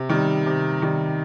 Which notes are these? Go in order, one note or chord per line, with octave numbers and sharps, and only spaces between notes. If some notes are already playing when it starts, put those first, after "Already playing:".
Already playing: C3
D#3 G3
C3
D#3 G3